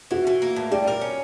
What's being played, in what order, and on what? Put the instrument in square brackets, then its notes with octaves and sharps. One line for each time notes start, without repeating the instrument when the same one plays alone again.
[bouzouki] E3 [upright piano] F#4
[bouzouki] E3
A#3
A2
[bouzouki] G3 [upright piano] G4
[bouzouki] A#4
C#4